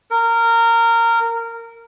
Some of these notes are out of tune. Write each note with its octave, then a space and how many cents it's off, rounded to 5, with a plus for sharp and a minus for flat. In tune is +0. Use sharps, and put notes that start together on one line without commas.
A#4 -15